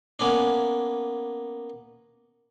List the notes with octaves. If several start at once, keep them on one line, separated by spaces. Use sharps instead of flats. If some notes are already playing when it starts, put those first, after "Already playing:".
A#3 B3 C#4 D4